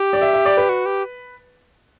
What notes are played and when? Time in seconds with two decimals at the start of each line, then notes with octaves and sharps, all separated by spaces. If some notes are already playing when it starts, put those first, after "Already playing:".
Already playing: G4
0.13 D5
0.21 E5
0.33 E5
0.45 D5
0.57 B4
0.69 F#4
0.86 G4